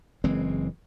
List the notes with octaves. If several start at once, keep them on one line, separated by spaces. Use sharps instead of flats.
F#1 E3 G#3 C4